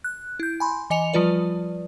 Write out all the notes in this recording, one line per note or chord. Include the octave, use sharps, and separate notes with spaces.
F#6
E4 G6
G#5 B5 C6
E3 D#5 G#5 C#7 F7
F3 G3 F4 B4 D5